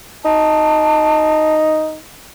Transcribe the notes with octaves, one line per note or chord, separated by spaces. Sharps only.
D#4 A5